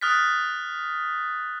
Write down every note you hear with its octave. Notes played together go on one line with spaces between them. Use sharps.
D#6 F6 F#6 A6 B6